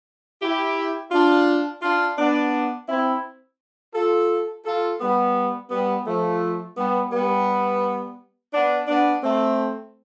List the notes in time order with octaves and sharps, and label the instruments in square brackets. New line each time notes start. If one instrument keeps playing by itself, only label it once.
[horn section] E4 G4
D4 F4
D4 F4
B3 D4
C4 E4
F4 A4
F4 A4
G3 B3
G3 B3
F3 A3
G3 B3
G3 B3
B3 D4
B3 D4
A3 C4